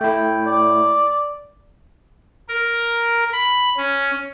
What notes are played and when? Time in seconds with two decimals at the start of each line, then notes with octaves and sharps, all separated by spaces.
0.01 A3 E4 G5
0.47 D5
2.49 A#4
3.33 B5
3.77 C#4